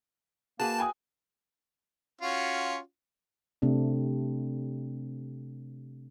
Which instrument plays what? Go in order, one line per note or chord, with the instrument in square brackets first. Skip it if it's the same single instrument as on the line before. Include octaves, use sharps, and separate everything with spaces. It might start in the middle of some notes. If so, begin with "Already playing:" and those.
[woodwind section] A#3 [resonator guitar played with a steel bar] F#4 G#4 B4 [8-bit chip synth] A5
[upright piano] G5 G#5 D#6
[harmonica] C#4 F4 F#4
[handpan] C3 A3 C4 D4